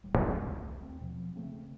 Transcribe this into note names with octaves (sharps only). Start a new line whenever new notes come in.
D1 D#2 G3
D#2 G#2 G3
C2 A3
D#2 C4
B2 F3 F#3
C#3 F3 A3 C4